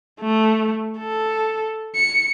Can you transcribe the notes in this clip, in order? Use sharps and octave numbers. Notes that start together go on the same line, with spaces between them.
A3
A4
C#7